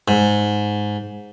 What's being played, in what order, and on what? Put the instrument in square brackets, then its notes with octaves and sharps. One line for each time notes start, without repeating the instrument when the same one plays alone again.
[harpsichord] G#2